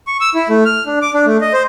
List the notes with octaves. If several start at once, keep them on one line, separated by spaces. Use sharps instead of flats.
C#6
E6
E4
A3
F6
D4
D6
D4
A3
D#5
C5